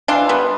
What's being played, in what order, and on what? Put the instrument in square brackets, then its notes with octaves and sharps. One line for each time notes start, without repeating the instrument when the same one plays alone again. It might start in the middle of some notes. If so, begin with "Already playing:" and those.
[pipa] E3 D4 F4
G3 B3